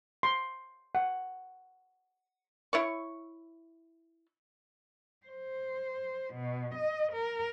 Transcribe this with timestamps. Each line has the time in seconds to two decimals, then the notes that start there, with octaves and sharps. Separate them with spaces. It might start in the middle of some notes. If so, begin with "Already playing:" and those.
0.23 C6
0.95 F#5
2.73 E4 C#5 C#6
5.26 C5
6.34 B2
6.75 D#5
7.13 A#4